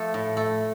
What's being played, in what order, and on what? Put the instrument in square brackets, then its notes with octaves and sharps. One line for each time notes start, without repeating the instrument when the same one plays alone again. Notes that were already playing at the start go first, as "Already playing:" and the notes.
Already playing: [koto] F3 A3
A2
A3